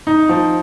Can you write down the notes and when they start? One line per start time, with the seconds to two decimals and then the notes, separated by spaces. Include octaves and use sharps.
0.07 D#4
0.29 F3